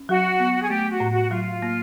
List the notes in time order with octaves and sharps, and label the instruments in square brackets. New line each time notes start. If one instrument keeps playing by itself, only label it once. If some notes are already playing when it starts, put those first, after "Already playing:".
Already playing: [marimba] C#4
[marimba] F#3 [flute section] F#4
[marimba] B3
[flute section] G#4
[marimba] A3 [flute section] G4
[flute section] F#4
[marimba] A2
[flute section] F#4
[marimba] F#3 [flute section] F4
[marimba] A#3